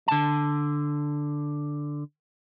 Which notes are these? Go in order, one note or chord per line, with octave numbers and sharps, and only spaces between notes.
D3 A5